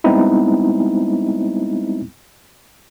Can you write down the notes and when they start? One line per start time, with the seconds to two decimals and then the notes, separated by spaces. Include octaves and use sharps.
0.04 G3 G#3 B3 C4 D#4 E4